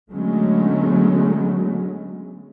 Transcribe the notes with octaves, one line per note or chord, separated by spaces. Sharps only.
D3 F#3 G#3 A3 B3 C#4